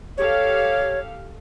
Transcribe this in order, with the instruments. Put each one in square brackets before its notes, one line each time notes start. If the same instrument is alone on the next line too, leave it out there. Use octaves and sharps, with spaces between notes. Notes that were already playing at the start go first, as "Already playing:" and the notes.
[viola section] G4 A4 F5 [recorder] C#5